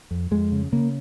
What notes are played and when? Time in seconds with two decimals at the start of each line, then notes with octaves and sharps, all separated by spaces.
0.11 F2
0.31 F2 G#3
0.52 C#3
0.72 C#3 A#3